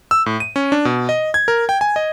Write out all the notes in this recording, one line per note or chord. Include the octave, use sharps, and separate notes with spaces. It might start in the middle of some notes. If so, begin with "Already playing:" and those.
E6
A2
D#7
C#4
D4
B2
D#5
G#6
A#4
G5
G#5
D#5